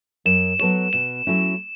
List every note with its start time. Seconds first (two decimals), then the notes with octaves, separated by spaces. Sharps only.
0.25 F#2 E7
0.59 F#3 B3 A4 C#5 E7
0.93 B2 E7
1.27 F#3 A3 C#4 E4